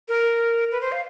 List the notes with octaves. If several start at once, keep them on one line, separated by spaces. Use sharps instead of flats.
A#4
B4
C5
F5